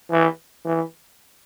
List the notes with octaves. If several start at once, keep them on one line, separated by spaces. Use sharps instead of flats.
E3
E3